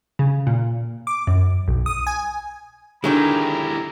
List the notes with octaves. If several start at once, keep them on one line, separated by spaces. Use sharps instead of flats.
C#3
A#2
D6
F#2
B1
D#6
G#5
D3 D#3 F#3 G#3 E4 G4 A#5